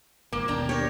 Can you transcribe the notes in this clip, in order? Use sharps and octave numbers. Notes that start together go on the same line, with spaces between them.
G#1 A#3
D#2 B2 D4 G5 A#5
G4 A#4 C#5